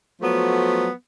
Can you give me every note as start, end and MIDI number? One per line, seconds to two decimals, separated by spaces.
0.21 0.89 53
0.21 0.89 54
0.21 0.89 57
0.21 0.89 59